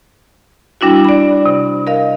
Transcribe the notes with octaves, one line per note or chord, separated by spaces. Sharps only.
G3 D4 E4 F#4
D5 B5
C3
A#4 D#5 F5